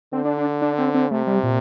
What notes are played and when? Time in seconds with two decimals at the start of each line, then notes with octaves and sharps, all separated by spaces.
0.13 D3 C4
0.25 D4
0.37 D4
0.62 D4
0.78 C4
0.94 C4
1.11 C3 A3
1.27 G3
1.43 A#2